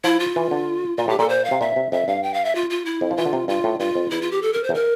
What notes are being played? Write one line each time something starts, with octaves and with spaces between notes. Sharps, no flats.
F3 E4
F4
E3
D3
A#2 F4
A2 G4
A#2 A4
C5
F5
C3
A#2 E5
C3
F2 E5
G2 F5
G5
F5
E5
F4
F4
E4
F2
F3
E3 F4
D3
C3
G2 F4
A2
G2 F4
F2
E2 E4
F4
G4
A4
A#4
C5
E2
A#4